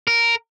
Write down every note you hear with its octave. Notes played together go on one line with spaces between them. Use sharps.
A#4